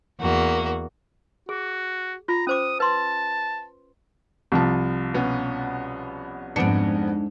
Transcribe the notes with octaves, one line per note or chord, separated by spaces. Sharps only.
E2 A#3 F#4
F#4 G#4
F4 A#5
C#4 C5 D6 D#6
B4 A5 C6
C2 F3 A5
B2 B3 C#4
F2 G#2 B3 D4 C#7